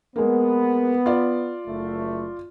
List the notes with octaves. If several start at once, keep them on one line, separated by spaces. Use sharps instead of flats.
G#3 A#3 B3
F4 D5
F#1 A3